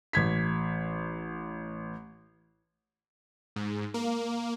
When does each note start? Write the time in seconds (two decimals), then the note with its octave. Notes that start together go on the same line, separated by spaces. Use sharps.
0.13 A1 G#6 B6
3.56 G#2
3.94 A#3